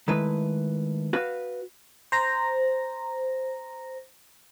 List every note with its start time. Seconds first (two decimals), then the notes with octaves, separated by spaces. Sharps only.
0.08 D#3 G#3 A3 E4 B4
1.13 F#4 B4 F5
2.12 C5 A#5 A#6